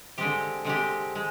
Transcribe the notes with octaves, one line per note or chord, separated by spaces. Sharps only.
D3 G#3 C4 G4
D3 G#3 C4 G4
G#3